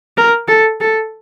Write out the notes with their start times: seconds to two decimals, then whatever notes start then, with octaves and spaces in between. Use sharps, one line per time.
0.17 A#4
0.48 A4
0.80 A4